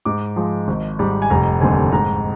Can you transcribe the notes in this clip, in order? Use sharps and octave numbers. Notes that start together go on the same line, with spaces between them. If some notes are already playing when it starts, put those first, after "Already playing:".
G#2 D6
F3 G#3
G#1
G#2 G3
G#5
F1 A#5
D#2 D3 G3 C4 G#5
G#2 A#5